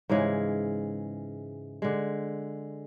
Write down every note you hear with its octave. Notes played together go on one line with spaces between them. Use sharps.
G#2 C#3 E3 G#3
D3 G#3